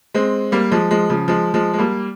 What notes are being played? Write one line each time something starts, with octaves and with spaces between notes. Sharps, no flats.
G#3 C4
G3 A#3
F3 G#3
F3 G#3
C#3 F3
F3 G#3
F3 G#3
G#3
G3 A#3